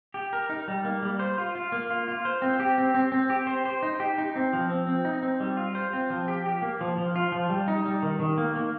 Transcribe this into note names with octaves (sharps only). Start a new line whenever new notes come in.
G4
A#4
D#4
G3
A#3
G3
C5
F4
F4
A#3
F4
F4
C5
C4
G4
C4
C4
C4
G4
C5
C5
D#4
G4
D#4
C4
F3
C4
C4
D#4
C4
G3
F4
C5
C4
F3
G4
G4
A#3
F3
F3
F4
F3
G3
D#4
G3
D#3
D#3
A#3
A#3